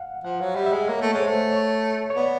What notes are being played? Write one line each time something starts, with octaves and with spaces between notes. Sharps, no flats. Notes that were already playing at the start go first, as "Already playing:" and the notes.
Already playing: F5 F#5
F3 F#5
F#3 F5
G3 E5
E5
G#3 D#5
A#3 C#5
A3
G#3 C#5
C5
A3
C#5
C#5
B3 D5